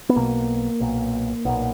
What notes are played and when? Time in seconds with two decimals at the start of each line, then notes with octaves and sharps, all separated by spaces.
0.09 B3
0.16 B1 B2 A#3
0.80 B1 A#2
1.45 B1 A#2 B3